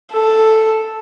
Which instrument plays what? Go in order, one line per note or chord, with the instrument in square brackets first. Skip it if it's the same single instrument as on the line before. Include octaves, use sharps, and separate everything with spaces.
[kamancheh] A4